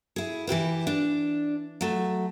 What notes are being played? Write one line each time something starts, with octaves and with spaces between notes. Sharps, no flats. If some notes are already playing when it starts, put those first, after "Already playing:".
E4 G#4
E3 E4 G4 B4
D4
F#3 A3